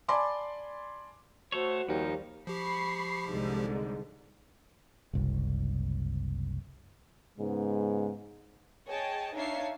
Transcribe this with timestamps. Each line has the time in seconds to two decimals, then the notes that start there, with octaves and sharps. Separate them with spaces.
0.08 D5 G#5 A5 B5 C6 D6
1.52 A3 F#4 A4 C5 C#5
1.89 D#2 F3 G3 D#4
2.47 F3 G4 B5 C#6 C7
3.31 C2 G#2 D3
5.13 F#1 C2
7.38 G#2 C#3 G#3 B3
8.89 G#4 C#5 D#5 G5 A5
9.34 D4 D#4 C#5 E5 F5 C7